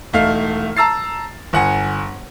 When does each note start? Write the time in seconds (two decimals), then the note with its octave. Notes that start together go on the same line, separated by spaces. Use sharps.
0.13 E1 A3 D#4 F5 F6 C7
0.77 A5 A#5 E6 A6 C7
1.53 G1 F#5 G#5